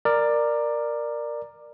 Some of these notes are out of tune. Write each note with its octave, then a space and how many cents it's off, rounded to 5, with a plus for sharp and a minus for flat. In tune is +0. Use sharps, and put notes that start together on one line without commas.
A#4 +0 D5 +15